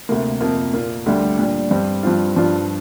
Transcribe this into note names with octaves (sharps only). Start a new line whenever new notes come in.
D2 C3 A#3
F2 C3 A#3 F4
A#2 A#3 F4
D2 D3 G3
A#2 G3 D4
G2 G3 C4
G2 F3 C4 F4
G2 F3 D4 F4